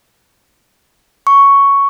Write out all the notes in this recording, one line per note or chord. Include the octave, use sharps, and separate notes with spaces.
C#6